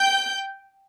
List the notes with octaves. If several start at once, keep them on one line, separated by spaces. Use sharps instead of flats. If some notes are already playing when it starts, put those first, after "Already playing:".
Already playing: G5 G6